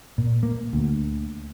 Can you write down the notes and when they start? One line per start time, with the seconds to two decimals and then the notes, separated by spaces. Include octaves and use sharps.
0.18 A#2
0.43 A#3
0.73 D2